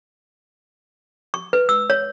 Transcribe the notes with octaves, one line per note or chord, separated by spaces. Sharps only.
C#6
B4
E6
C#5